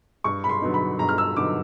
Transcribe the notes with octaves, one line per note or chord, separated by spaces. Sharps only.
G2 C#6
B5
C6
D3 F#3 B3 D#4
B5
G2 A#5
F6
E6
D3 F#3 B3 D#4 D6